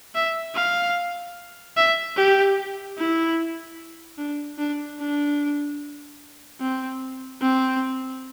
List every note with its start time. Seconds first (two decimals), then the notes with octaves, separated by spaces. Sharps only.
0.15 E5
0.55 F5
1.77 E5
2.16 G4
2.97 E4
4.18 D4
4.58 D4
4.99 D4
6.60 C4
7.41 C4